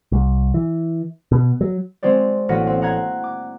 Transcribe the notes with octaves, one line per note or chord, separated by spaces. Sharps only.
C2
E3
B2
F#3
G#3 C4 F#4 C5 D5
A1 A#3 F#4 B4 F#5 A#6
C4
D#5 F#5 A#5 F#6 G#6 C7
D6